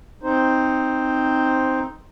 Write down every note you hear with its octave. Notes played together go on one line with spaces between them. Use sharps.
C4 D#4 C5